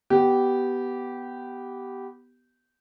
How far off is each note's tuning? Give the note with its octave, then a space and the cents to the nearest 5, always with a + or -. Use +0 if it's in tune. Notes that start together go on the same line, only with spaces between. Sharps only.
B3 +0 G4 -15